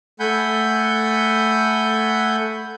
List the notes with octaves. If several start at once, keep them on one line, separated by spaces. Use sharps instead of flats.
A3 F#5 G#5 B5 G6